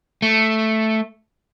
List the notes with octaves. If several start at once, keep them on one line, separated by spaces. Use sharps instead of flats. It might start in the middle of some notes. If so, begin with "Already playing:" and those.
A3